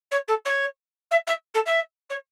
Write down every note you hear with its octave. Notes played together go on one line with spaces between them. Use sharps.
C#5
A4
C#5
E5
E5
A4
E5
C#5